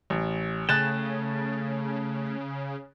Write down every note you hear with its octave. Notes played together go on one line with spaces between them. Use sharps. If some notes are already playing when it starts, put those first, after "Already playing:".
A1
C#3 A3 G#4 G5 F#6 A6 E7